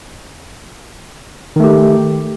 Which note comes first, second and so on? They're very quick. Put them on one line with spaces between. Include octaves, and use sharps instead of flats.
D#3 A3 G4